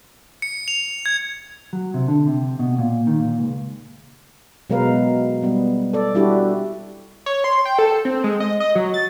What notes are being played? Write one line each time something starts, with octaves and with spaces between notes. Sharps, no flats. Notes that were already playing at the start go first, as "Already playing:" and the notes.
C#7
F7
G#6
F#3
C3
D3
C3
B2
A#2
D#3
A#2
C#2
B2 F#3 G#3 A#4 B4 F5
G3 B3
A4 D5
G3 D4 E4 F#4 G4
C#5
C6
G5
A4
C4
G#3
D#5
D#5
F#3
A6